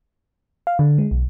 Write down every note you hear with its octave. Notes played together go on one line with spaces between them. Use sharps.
F5
D3
G#3
B1